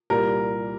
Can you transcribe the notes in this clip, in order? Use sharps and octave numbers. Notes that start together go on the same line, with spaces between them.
C2 A#2 G3 A#4